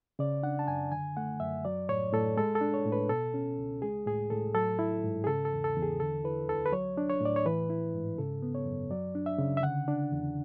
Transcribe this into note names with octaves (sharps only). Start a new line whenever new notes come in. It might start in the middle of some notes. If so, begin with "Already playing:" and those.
C#3 D5
D4 F#5
A5
F#2 G#5
D3 G#5
A3 F#5
F#2 E5
F#3 D5
A2 C#5
A2 A4
G#3 A4
A4
D4
C#5
A2
B4
B2 A4
C#4
C#2
G#3 G#4
A2 G#4
A2 A4
F#3 A4
E4
G#2
G#4
C#3 A4
A4
E2
A4
E2
G#4
D3 A4
E4 B4
D2 A4
B4
F#3 C#5
D4
C#5
A2 D5
C#5
E3 B4
E4
G#2
C#3 A4
B3
C#5
F#2
F#3 D5
D4
E5
C#3
E5
D3 F#5
D4
E2